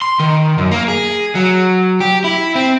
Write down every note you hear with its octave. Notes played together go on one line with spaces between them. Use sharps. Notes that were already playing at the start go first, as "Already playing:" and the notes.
C6
D#3
F#2
A#3
G#4
F#3
G4
E4
C4